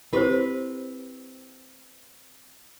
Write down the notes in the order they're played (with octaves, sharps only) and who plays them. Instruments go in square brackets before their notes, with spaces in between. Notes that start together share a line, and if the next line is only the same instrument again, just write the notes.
[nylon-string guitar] C4 B4 [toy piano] E4 G4 C5